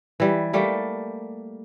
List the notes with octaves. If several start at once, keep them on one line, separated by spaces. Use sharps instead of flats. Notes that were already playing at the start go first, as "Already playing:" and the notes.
E3 G3
G3 A3 A#3